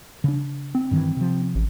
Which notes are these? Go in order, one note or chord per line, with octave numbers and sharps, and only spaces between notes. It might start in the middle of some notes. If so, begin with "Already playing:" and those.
C#3 D4
C4
G2 D#3 E3
C3 F3
A1